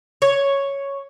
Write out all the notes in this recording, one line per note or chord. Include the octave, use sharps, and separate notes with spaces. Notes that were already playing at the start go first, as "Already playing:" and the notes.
C#5